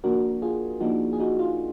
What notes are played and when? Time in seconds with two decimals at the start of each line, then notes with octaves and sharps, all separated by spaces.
0.04 F3 A#3 D4 F#4 A#4
0.42 F4 G#4
0.80 F3 A#3 D4 D#4 F#4
1.13 G#4
1.20 D#4 F#4
1.39 F4